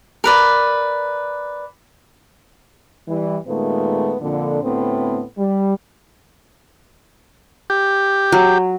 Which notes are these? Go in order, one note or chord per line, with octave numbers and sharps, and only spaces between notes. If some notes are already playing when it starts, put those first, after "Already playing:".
A#4 B4 D5
E3 G3
A#2 D#3 G#3 A3 B3
F2 A#2 D3
D2 A2 B3 C4
G3
G4
F#3